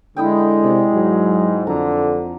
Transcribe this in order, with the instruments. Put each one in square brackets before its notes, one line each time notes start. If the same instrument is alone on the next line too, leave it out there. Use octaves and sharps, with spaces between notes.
[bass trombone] D3 [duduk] G#3 [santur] E4 D#5 G5
[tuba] C3 [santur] D5
[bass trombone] G#2 [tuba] F#3
[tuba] F2 [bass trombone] D3 [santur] A#5